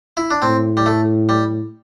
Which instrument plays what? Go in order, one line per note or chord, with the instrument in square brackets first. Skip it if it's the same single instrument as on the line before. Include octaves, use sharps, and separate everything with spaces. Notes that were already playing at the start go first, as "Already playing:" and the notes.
[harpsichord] E4
D4
[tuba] A2 [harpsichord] C4
[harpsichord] G3
A3
G3